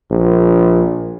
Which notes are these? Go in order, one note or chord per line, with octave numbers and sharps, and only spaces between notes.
A#1